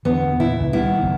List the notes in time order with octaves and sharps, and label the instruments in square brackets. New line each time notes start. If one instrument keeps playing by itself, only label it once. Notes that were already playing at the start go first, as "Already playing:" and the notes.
[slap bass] E2 D3 E3 [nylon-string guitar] B3
[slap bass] A#2 [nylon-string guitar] E4
[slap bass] C#2
[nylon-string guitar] D#3 B3 E4 [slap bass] G3
[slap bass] F#1